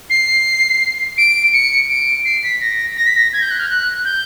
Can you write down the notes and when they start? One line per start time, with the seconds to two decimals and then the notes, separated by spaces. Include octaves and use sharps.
0.10 C7
1.18 D7
1.54 C#7
1.89 D7
2.25 C7
2.43 B6
2.61 A#6
2.97 A#6
3.07 B6
3.16 A#6
3.33 G#6
3.42 G6
3.51 F#6
3.60 F6
3.69 F#6
4.05 G6